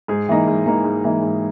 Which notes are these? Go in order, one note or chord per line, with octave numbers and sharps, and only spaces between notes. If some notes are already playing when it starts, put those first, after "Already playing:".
G#2 G#4
E3 A#3 D#4
G#2
E3 A#3 D#4
G#2
E3 A#3 D#4
G#2